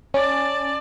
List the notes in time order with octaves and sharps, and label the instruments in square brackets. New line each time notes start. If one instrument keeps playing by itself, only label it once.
[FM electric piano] C#4 [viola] D5 A5